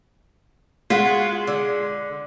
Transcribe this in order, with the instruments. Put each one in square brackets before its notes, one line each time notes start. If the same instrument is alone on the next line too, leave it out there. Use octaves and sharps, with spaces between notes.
[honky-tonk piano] G#3 B6 [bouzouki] F4 F#4
[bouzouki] D3